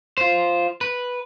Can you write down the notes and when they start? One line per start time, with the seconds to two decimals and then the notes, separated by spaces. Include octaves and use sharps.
0.17 F4 C5
0.81 B4